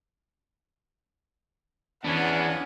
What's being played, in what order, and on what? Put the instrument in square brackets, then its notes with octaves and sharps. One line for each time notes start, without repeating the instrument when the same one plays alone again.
[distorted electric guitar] E2 B3 [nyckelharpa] C#4 G#5 [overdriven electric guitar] D4 [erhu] F#5